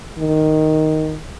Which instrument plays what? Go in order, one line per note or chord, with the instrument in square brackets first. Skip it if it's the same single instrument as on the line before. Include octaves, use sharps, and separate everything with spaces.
[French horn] D#3